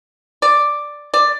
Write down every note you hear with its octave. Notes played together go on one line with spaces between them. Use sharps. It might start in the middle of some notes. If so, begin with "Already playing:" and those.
D5
D5